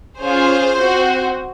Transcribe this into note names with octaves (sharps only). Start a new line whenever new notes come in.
C#4 F4 G#4 C5
C4 F#4